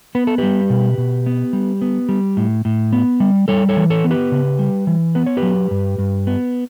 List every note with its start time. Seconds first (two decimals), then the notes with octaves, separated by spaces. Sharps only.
0.15 B3 B4
0.27 A4
0.38 G3 G4 B4
0.70 B2
0.98 B2
1.26 B3
1.53 G3
1.82 B3
2.09 G3
2.37 A2
2.65 A2
2.92 B3
3.20 G3
3.48 G3 A4 C#5
3.69 A4 C#5
3.77 E3
3.90 A4 C#5
4.04 B3
4.10 G4 B4
4.32 C#3
4.59 G3
4.87 E3
5.15 B3 B4
5.26 C#5
5.37 G4 B4
5.43 F#3
5.71 G2
5.98 G2
6.27 B3